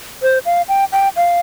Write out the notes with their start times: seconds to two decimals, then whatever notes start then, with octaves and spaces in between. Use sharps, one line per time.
0.22 C5
0.46 F5
0.68 G5
0.92 G5
1.16 F5